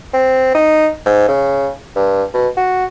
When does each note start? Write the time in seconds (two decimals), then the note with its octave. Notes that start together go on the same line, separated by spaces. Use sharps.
0.13 C4
0.55 D#4
1.06 G#2
1.28 C#3
1.95 G2
2.34 B2
2.57 F#4